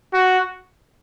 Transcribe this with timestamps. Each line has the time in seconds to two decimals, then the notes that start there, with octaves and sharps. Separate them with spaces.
0.14 F#4